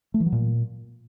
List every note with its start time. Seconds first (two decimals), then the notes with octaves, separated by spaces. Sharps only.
0.14 A3
0.20 E3
0.26 F#3
0.32 A#2